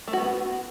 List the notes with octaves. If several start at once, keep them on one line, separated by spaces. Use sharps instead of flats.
A3
F#4
B3